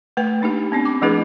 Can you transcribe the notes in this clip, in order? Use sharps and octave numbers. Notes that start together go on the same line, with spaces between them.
A3 B4 G5
A#3 D4 D#4 G4
B3 C4 D4
D6
F3 A3 D4 E4 G#4 B4